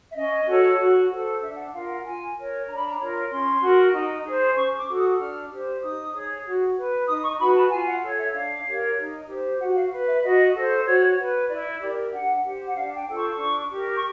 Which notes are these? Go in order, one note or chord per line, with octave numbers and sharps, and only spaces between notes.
E5
C#4 D#5
F#4 A4 C#5
F#4
A4 C5
D4 E5
F#5
F4 A#4 F5
F#5
F4 G#5
A#4 C#5
D4 A#5
B5
A#5
F4 A#4 C#5
C#4 C6
F#4 A#4
D#4
G#4 C5
C#4 C#6
D6
F#4 A4
D#6
D4 F6
G4 C5
D#4 D#6
G#4 C#5
F#4
B4
D#4 D#6
C#6
F#4 B4 B5
A5
F4 G#5
F#5
A4 C#5
E5
D4 F5
G4 A#4 C#5
D#4
G4 C5
F#4 F#5
F5
B4
E5
F#4 D#5
A4 C5
F#4 C#5
B4
E4 D5
G4 A#4 D5
D4 F#5
G4 C5
F#5
D4 F5
G5
F4 A4 C5
C#6
D4 C#6
G4 A#4
C#6